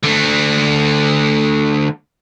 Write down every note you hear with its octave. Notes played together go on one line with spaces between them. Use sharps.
D3 A3